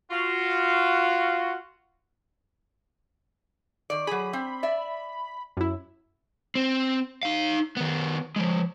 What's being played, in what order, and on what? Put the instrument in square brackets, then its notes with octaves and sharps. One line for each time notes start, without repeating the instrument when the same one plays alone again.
[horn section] F4 F#4
[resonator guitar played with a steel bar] D#3 D5
[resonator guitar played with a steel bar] F#3 G#4 [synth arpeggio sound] B5
[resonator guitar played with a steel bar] C4
D5 E5
[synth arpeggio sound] F#2 E4
[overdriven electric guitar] C4
D#4 F5
D#3 B3
F3 G#3